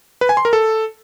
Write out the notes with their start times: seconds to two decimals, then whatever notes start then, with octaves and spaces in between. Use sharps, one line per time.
0.21 B4
0.29 G#5
0.37 C6
0.45 A#4
0.53 A4